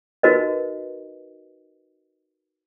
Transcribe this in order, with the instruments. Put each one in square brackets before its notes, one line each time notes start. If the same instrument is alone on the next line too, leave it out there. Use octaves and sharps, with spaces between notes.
[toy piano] D#4 F#4 A#4 B4 D#5